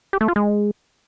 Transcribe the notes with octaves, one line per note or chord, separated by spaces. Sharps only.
G4
A3
F4
G#3